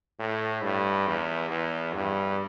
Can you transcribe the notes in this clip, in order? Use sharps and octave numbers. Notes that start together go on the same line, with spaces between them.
A2
G2
E2
E2
G2